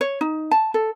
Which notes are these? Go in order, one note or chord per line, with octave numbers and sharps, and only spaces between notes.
C#5
D#4
A5
A4